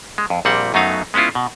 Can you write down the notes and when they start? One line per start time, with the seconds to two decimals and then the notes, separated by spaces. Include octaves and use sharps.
0.18 G#3
0.30 F2
0.45 A#1 A#2 G3 C4 F#5
0.74 F#2 F#3 A3 B3 D#4 F5
1.14 G#3 B3 C#4 E4 F4
1.35 B2